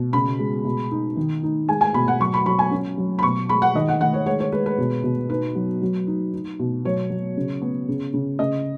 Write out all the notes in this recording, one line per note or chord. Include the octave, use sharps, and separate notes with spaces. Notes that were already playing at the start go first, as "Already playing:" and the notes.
Already playing: B2
C#3 B5
G#3
B2
D#4
D#3
D#4
G#3 G#5
G#5
B2 B5
F#5
F#3 C#6
B5
F#3 B5
G#5
C#4
F#3
B5
B2 C#6
G#3 B5
F#5
D#3 D#5
F#5
D#3 F#5
C#5
G#3 C#5
C#5
G#3 B4
B4
B2
B2
D#4 B4
F#3
F#3
D#4
D#4
B2
F#3 C#5
F#3
C#3
B3
C#3
C#3
C#3 D#5